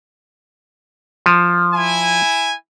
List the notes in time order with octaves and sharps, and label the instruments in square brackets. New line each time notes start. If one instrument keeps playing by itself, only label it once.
[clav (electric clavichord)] F3
[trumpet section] E4 G#5